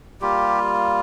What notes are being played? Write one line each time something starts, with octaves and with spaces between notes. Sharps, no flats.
G3 A#3 F4 G4